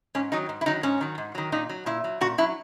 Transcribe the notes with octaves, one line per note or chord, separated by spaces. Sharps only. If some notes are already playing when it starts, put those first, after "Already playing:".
G#2 C#4
D#3 F#3 D#4
G#2
E4
D#3 F#3 D#4
G#2 C#4
D#3 F#3
G#2
D#3 F#3
A#2 D#4
F#3
A#2 E4
F#3
A#2 F#4
F#3 E4